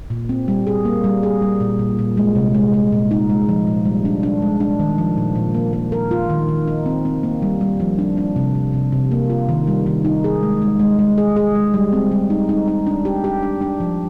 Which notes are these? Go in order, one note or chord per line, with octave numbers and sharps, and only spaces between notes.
A#2
C4
G3
G#4
A#3
G3
G#4
G3
A#2
A#2
A#2
G#3
C3
G#3
G#3
A#2
D#4
G#3
F3
A#2
G3
D4
D4
G#3
D4
D#3
F3
A#2
A#2
A#3
A#3
A#4
F4
D#3
D#3
D#4
C4
C4
A#3
G3
G3
F3
D4
D4
C3
C3
C3
C3
A#3
F4
D#3
G3
D#3
D#4
G#4
G#3
G#3
G#3
G#3
G#4
G#4
G#3
G3
C4
G3
D#4
D#4
D#4
D4
G4
G4
D4
D4
F3